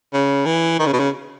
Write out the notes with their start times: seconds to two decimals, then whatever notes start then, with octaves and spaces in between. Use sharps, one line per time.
0.13 C#3
0.46 E3
0.79 D#3
0.86 C#3
0.93 B2
0.99 C#3